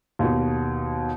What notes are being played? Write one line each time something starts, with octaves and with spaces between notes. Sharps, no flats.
D#2 B2